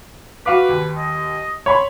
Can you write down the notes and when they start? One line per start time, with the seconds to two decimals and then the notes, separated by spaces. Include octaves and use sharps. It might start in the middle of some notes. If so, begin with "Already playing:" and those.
0.46 F#4 B4 F5 D6
0.69 D#2
0.98 D#5
1.66 C#5 B5 C6